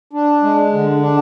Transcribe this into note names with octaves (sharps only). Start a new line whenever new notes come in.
D4
G#3
D3
D4